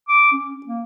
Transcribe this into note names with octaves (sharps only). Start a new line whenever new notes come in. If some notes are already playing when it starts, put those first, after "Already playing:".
D6
C#4
A#3